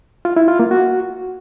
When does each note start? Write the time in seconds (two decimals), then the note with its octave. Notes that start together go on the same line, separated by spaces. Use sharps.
0.25 F4
0.36 E4
0.48 F4
0.59 A#3
0.71 F#4